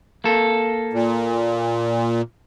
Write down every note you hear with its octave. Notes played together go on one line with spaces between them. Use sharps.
A#3 A4
A#2